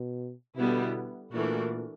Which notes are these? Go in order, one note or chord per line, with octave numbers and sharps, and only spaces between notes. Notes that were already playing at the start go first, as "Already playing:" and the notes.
Already playing: B2
B2 D3 G3 B3 E4
A#2 E3 A3 D4 F#4 A#4